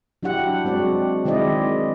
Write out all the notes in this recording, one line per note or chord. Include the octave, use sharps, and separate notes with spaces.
F#3 D4 E4 G4 F#5
G#3 C4 F#4 D5
D#3 G#3 C4 E4 D5 D#5